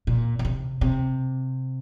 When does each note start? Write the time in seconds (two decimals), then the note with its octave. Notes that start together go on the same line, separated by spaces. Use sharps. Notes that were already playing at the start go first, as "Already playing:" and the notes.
0.07 A#2
0.39 A#2
0.45 C3
0.81 C3